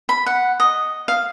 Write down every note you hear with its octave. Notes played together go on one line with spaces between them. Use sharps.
B5
F#5
D#5
F5